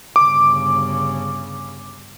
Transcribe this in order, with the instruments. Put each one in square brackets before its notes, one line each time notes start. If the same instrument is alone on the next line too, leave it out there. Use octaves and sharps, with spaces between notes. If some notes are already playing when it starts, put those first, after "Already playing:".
[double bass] G1 C#3 [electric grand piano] D6